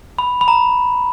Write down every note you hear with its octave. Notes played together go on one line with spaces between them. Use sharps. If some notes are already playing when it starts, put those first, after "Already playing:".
B5
B5
A#5